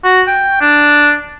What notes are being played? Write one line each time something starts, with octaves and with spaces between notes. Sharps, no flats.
F#4
G5
D4